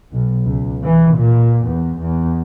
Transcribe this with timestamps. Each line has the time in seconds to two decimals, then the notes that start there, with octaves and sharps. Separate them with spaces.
0.12 B1
0.45 C#2
0.84 E3
1.15 A#2
1.66 E2
2.00 E2